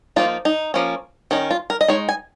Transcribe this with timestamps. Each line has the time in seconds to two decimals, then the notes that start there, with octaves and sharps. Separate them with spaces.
0.16 F3 A#3 D#4 F4
0.45 D#4
0.74 F3 A#3 C#4
1.31 D#3 C#4 D#4
1.51 F4
1.70 A#4
1.81 D#5
1.88 G#3 D#4 C#5
2.09 G#5